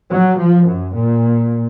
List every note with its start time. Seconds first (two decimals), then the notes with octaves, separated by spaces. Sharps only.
0.10 F#3
0.39 F3
0.67 F#2
0.95 A#2